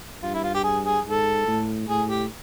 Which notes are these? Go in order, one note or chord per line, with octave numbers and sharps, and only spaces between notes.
G2 F4
E4
F4
G4
G#4
G#4
G#2 A4
A2
A2 G#4
G4